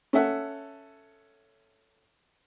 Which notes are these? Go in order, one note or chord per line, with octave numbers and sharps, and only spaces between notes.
C#4 A4 E5 F#5